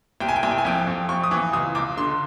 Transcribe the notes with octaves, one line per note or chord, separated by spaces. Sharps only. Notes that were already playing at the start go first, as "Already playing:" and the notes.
C2 G5
G#5
G5
C2 G#5
G5
G#5
F2 G5
F2
F2 C#6
D#6
E3 D6
C#2 D#6
C#2 D6
D3 C6